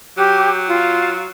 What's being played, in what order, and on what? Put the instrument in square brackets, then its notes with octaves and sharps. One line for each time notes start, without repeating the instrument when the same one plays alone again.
[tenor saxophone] F#3 [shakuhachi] G4
[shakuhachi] F4